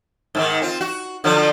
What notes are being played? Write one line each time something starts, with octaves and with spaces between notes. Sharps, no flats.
G#2 D3 D#3
C4 F4
F#4
D3 F3 F#3